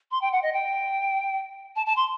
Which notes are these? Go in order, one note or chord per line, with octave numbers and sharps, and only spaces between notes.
C6
G5
F#5
D#5
G5
A5
A5
C6